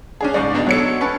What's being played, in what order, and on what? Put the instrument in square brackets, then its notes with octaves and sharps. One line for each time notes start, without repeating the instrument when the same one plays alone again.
[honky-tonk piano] C#4 D4 G#4
[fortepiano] G#2 C#3 [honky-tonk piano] D5
[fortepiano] B1 D4 D#4
[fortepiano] B2 A4 [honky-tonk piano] F#3 C#5 C#7
[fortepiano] C#4 B4 A5